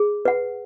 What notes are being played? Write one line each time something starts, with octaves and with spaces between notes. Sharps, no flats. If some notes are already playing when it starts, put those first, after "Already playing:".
Already playing: G#4
B4 F#5